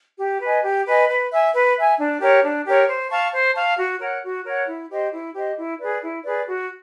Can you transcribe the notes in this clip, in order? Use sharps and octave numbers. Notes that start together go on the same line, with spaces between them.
G4
B4 D#5 G#5
G4
B4 D#5 G#5
B4
E5 G#5
B4
E5 G#5
D4
G4 A#4 C#5
D4
G4 A#4 C#5
C5
F5 A5 C#6
C5
F5 A5 C#6
F#4
A#4 C#5 F#5
F#4
A#4 C#5 F#5
E4
G4 C5 D#5
E4
G4 C5 D#5
E4
G#4 B4 D5
E4
G#4 B4 D5
F#4